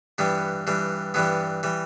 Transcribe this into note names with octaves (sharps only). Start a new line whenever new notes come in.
G2 E3 G3 B3
G2 E3 G3
G2 E3 G3 B3
E3 G3